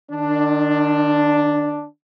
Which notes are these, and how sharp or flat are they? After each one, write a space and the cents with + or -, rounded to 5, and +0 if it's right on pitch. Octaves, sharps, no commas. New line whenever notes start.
D#3 -40 D4 +0